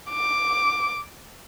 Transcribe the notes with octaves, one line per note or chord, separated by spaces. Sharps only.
D6